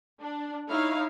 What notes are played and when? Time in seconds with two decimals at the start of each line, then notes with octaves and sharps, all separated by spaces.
0.20 D4
0.68 D#4 E4 C#5 F5